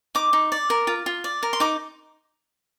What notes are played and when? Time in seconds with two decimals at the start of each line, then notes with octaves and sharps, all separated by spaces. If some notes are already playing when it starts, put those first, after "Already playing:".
0.15 D#4 D6
0.33 D#4
0.52 D5
0.70 A#4
0.87 F4
1.06 F4
1.24 D5
1.43 A#4
1.53 C6
1.60 D#4 D6